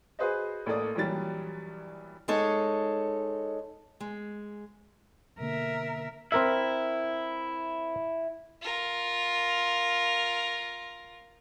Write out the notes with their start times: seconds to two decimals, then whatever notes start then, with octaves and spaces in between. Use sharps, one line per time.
0.19 F#4 G#4 B4 C5 D#5
0.66 A1 A3 A#3 A4 D5 D#6
0.95 A#1 E3 F#3 G3 A6
2.28 G#3 D#4 A4 C#5
4.00 G#3
5.40 B2 D3 A#3 A#4 E5
6.32 C4 E4 A#4 E5
8.61 F4 A#4